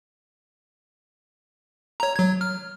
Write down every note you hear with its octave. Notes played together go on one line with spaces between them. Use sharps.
C#5 A#5
F#3 G#6
F6